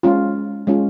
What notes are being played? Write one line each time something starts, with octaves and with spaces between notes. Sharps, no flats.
G#3 C#4 F4
G#3 C#4 F4